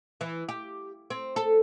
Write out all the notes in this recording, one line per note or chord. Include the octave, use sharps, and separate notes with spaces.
E3
G4
C4
A4